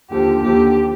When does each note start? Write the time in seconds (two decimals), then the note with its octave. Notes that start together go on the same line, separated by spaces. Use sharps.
0.09 D#2 D3 F3 G4
0.42 D#2 D3 F3 G4